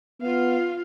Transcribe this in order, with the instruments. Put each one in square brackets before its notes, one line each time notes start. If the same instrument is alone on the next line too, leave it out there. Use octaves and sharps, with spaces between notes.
[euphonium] B3 [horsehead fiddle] F4 F5